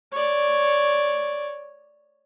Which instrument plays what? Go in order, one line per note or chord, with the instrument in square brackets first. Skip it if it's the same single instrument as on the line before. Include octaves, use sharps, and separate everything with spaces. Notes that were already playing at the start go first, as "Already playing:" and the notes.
[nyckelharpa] C#5 D5